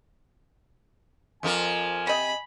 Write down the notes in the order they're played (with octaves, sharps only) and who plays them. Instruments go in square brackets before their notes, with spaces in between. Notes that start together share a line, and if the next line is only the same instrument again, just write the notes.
[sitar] F2 F3 A#4 [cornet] G#5
[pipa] C3 D#5 [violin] B5